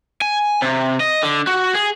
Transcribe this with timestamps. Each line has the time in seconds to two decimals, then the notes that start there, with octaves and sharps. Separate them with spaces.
0.21 G#5
0.62 C3
1.00 D#5
1.23 D3
1.47 F#4
1.74 G#4